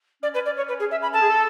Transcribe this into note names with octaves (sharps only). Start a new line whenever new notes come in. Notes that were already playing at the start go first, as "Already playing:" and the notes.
C#4 D5
B4
D5
C#5
B4
G#4
E5
B5
A4 A5
G#4
A4